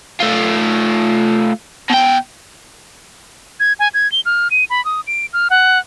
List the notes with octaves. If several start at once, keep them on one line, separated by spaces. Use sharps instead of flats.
A3 F4
B2 G5
G#6
G#5
G#6
G7
F6
D#7
B5
D#6
D7
F6
F#5